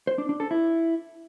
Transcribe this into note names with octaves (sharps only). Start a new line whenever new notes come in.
C5
D4
D4
A4
E4